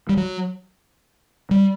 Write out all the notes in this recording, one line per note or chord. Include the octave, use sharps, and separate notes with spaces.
G3
F#3
G3